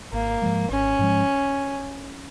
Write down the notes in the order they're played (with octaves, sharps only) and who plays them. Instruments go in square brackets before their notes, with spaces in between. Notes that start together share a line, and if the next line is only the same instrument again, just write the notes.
[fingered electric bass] G#1 [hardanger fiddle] A#3
[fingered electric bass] G#2 F3 G#3
[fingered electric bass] G#1 [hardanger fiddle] C#4
[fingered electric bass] G#2 F3 G#3